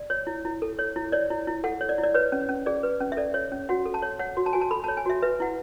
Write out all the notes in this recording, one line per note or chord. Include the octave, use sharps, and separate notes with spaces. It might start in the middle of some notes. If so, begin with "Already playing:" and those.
Already playing: D5
C#5
E4
E4
A4
C#5
E4
C#5 D5
E4
E4
A4 F#5
C#5
D5
E4
D5
B4 C#5
C#4
C#4
G#4 D5
B4
C#4
E5
A4 D5
C#5
C#4
F#4 F#5
A4
A5
C#5
C#5 F#5
F#4
A5
F#4 G#5
A5
A4 B5
A5
C#5
G#5
F#4 E5
B4 E5
E4 F#5